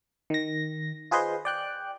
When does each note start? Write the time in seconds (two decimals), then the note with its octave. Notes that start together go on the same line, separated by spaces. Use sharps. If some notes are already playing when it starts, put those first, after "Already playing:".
0.30 D#3 A#6
1.11 F4 G#4 B4 C5 D#5 C6
1.45 D5 G5 F#6